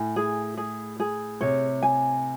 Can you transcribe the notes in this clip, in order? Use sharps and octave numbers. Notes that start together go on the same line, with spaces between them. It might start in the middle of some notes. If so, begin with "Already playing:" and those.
Already playing: A2 G#5
G#4
G#4
G#4
C3 C#5
G#5